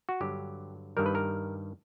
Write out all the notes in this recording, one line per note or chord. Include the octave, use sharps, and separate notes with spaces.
F#4
G2 D3 F#3 G4
G2 D#3 G3 A#4
B4
A#4